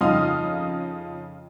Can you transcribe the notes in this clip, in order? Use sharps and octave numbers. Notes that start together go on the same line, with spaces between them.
F2 C#3 D#4 F5 D#6 F6